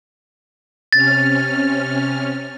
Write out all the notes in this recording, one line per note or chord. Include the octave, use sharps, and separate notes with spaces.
C3 C#4 F6 A6